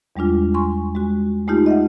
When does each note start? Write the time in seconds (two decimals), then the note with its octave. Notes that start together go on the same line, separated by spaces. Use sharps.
0.16 E2 G3 G#3 D4 F4
0.54 G#5 C6 C#6
0.95 G#3 F#4
1.47 G#3 A3 D#4 F4 G4
1.66 D#5 E5 F#5